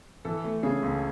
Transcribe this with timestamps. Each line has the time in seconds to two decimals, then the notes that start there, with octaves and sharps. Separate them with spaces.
0.25 E3 A4
0.44 A3
0.63 C#3 G#4
0.83 C#2